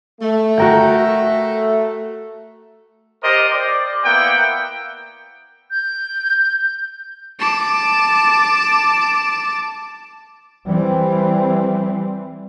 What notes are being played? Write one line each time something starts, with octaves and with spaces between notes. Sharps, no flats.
A3
F#4 A#4 G5
G4 A#4 C5 D5 D#5
C5 D5
A#3 B3 E4 F#5 G5
G6
A5 D6
E3 G3 C4